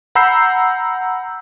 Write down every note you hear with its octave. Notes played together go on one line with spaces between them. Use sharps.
F#5 A#5 B5 E6 G6 C7